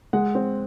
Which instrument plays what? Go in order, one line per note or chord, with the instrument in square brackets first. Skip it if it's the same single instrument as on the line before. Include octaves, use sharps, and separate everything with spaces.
[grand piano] G#3 F#5
C4